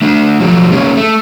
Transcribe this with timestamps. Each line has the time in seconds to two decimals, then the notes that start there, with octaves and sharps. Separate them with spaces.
0.02 A3 D4
0.40 F3 F#3 A3 G4
0.71 G#3 A#3 C#4 G#4 C#5
0.97 A3